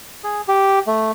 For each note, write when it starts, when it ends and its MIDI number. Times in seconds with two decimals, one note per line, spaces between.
0.24 0.41 68
0.48 0.79 67
0.87 1.12 57